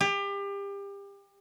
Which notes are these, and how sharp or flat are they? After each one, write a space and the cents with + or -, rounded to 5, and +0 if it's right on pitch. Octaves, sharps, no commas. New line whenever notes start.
G4 +30